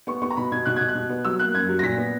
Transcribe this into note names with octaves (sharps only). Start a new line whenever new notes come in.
B3 C#6
B3 C#6
A#5
B2 B5
B2 G#6
B2 F#6
B2 G#6
F#6
B2
B3
F#3 E6
A#3 F#6
F#2 G#6
F#3
A#6
A#2 B6
B3